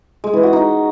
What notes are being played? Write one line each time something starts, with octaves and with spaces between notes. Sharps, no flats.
G#3
E3
F#4
D#4